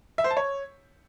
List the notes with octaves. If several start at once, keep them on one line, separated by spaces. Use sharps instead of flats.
E5
C5
A5
C#5